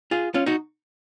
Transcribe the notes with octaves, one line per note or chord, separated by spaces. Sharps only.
F4 G#4
C#4 F4
D#4 F#4